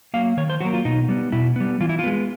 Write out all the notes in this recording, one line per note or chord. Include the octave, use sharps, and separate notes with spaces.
F#3 A#3 F5
D#3 C#5
C5
F#3 A#3 F#4
F4
B2 D#4
G3 B3
B2 E4
G3 B3
E3 F4
E4
F4
G#3 B3